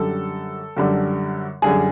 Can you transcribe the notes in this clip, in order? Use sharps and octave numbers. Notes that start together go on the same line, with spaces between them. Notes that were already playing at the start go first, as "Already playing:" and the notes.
Already playing: F#2 D3 G3 A4
F#2 D3 G3
F#2 D3 G3 G#4